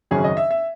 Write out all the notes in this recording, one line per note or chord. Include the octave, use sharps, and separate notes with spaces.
G#1 F#2 C#3 F#3 C#4 G#4
D#5
E5
E5